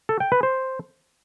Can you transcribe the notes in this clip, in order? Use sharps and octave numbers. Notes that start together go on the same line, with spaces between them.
A4
G5
B4
C5